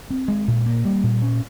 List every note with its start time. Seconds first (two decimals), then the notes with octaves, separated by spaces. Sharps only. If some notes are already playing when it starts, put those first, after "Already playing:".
0.10 C4
0.28 G#3
0.48 A#2
0.66 A#3
0.85 G3
1.03 A#2
1.22 C#4